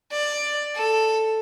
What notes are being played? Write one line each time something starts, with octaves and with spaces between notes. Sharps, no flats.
D5
A4